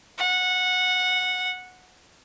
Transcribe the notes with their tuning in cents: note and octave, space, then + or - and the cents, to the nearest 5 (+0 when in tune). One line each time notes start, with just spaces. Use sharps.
F#5 -15